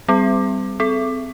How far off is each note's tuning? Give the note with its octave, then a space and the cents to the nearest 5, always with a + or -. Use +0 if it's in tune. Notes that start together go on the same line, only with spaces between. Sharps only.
G3 +0 C4 -25 G#4 +0
C4 -25 A4 -20